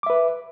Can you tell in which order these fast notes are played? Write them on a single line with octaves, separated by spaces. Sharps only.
D6 E5 B4